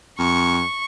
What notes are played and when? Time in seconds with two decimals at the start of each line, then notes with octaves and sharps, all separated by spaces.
0.19 F2 C#6